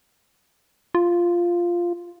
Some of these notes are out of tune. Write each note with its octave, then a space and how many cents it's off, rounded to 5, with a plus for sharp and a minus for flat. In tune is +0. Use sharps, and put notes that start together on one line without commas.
F4 -5